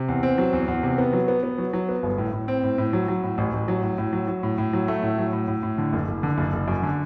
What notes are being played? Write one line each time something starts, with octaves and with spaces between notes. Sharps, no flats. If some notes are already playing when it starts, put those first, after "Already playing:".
Already playing: C3
E2
C4
F#3
E2
E2
C3
B3
F#3
B3
B3
F#3
F#3
B3
G1
A2
A2
C4
A2
A2
F#3
F#3
A2
A1
A1
F#3
A2
A2
F#3
F#3
A2
A2
F#3
A3
A2
F#3
A2
A2
A2
D3
F#1
F#1
D3
F#1
F#1
F#2
D3